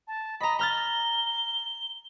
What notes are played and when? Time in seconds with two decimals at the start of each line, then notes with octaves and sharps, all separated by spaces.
0.08 A5
0.41 D#5 A#5 B5
0.59 A#5 F6 A6 G7